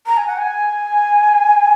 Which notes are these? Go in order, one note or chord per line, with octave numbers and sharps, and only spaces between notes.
A#5
G#5
F#5
G#5